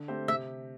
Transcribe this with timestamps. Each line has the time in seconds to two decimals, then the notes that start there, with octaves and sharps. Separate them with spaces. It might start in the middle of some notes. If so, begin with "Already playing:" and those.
Already playing: D3
0.08 A3 C4 G4 C5
0.28 C3 E5